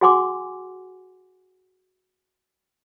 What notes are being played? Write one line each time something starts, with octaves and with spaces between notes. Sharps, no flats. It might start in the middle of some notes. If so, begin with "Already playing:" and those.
F#4 G#4 F#5 G#5 C6 D6